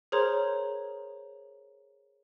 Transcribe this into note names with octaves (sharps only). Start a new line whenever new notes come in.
G#4 A#4 C5 C#5 A#5 C6